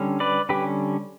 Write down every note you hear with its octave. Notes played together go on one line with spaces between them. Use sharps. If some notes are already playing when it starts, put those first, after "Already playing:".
Already playing: D3 G3 C#4
B4 D5
D3 G3 C#4 G4 B4